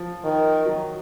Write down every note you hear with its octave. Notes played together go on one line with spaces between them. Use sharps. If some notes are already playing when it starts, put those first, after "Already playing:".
Already playing: F3
D#3
F#3